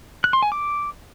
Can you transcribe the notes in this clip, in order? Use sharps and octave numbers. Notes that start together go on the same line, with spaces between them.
F#6
C6
G#5
D6